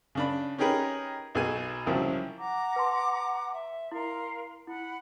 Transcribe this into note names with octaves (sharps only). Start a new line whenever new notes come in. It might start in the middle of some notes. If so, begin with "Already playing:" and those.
C#3 D4 B5
C#4 D#4 G4 G#4 A#4 B4
B1 B2 G#4 G#5
C2 C#3 F3 F#3
F#5 A#5 D6
B4 A5 C6
E5
E4 A#4 F5 C6
E4 F#5 B5